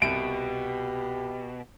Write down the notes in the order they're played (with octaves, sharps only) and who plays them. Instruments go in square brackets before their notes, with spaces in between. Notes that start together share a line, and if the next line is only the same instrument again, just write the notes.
[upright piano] C2 D7 [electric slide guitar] B2 [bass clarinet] G4